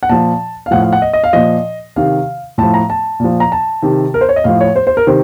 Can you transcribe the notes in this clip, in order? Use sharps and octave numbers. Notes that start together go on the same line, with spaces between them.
F#5
A#2 F3 A5
F5
A2 F3 F#5
F5
F#5
D#5
D#5
F5
A#2 F3 D#5
C3 D#3 F5
A2 F3 A5
A#5
A5
A#2 F3
A#5
A5
C3 D#3
A#4
C5
C#5
D#5
A2 F3 F5
C#5
C5
C5
A#4
C3 D#3 C5